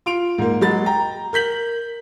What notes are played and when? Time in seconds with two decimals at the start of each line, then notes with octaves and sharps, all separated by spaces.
0.06 F4 C6 D7 F7
0.38 G#2 A#3
0.61 F#3 G#3 B5 A6
0.86 G5 A#5
1.33 A#4 G6 B6 F#7